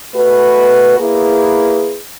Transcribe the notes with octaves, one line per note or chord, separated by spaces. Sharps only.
A3 F#4 B4
A#3 E4 G#4 B4